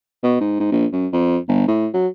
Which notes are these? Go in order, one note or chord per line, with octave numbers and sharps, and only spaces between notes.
B2
G#2
G#2
A#1
F#2
F2
G1
A2
F#3